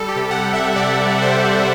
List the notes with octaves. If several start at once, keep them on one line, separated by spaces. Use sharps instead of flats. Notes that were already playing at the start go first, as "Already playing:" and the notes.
Already playing: G3 A4
G4
C3
F#5
G3
E5
C3 D5
G3
C5
C3